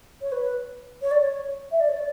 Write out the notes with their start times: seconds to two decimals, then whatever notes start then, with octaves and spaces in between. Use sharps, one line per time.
0.22 C#5
0.32 B4
1.02 C#5
1.11 D5
1.21 C#5
1.72 E5
1.80 D5
1.89 C#5
1.96 D5